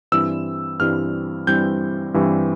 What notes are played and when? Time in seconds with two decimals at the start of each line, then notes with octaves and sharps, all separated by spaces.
0.12 G2 E3 G3 C4 E4 E6
0.80 G2 E3 G3 C4 E4 F6
1.47 G2 E3 G3 C4 E4 G6
2.14 G2 E3 G3 C4 E4